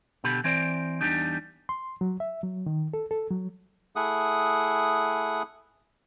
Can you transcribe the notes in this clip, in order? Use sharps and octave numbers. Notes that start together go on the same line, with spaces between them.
B2 D3 G4 B5
E3 C4 C5 D5
E2 G3 D4 D#4
C6
F#3
E5
F#3
D#3
A4
A4
F#3
A3 E4 G#4 F#5 D#6